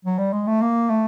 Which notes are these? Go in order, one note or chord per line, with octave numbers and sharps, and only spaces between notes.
F#3
G3
G#3
A3
A#3
A3